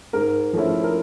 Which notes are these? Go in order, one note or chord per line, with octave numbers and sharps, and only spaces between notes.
G#2 A#4
F3 A3 C#4 E4
A#4